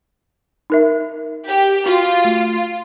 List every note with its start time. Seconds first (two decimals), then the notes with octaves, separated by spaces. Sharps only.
0.70 D#4 A#4 E5
1.46 G4
1.86 F4 F#4
2.25 A3